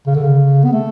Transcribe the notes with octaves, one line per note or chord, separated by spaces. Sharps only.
C#3
D3
C#3
B3
A3